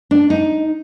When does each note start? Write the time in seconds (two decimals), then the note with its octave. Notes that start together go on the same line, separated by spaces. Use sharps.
0.11 D4
0.30 D#4